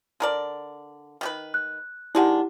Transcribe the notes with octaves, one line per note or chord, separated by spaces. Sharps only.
D3 A#4 D5
D#3 G4 B4
F#6
D#3 G#3 D4 E4 G4 F#5